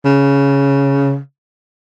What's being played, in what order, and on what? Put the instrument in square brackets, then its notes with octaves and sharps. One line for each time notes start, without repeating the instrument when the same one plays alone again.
[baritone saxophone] C#3